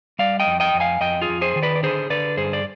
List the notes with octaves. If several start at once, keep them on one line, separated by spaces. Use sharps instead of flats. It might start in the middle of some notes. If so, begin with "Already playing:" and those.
G3 D5 F5
D#5 G5
F2
D#5 G5
F2
F5 G#5
F2 D#5 G5
F4 G#4
F2
G#4 C5
D#3
B4 D5
D5
D3 G#4 C5
D3 B4 D5
G2 G#4 C5
D5